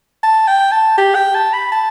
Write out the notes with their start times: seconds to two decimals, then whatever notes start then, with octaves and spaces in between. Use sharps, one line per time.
0.23 A5
0.47 G5
0.72 A5
0.98 G4
1.15 G5
1.35 A5
1.53 B5
1.72 A5